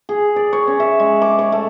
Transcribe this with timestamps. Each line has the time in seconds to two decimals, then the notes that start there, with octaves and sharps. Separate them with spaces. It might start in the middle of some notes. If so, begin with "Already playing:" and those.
0.09 G#4
0.36 D5
0.53 C#5
0.68 C#4
0.80 E5
1.00 G#3
1.22 D6
1.39 C#5
1.52 A3